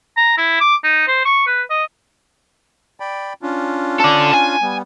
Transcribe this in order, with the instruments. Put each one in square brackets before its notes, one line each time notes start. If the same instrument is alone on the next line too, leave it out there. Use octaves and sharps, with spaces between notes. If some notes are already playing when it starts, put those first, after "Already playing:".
[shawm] A#5
E4
D6
D#4
C5
C#6
B4
D#5
[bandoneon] D5 G5 B5
C#4 D4 F4
[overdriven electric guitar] A4 D5
G#5
[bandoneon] G3 B3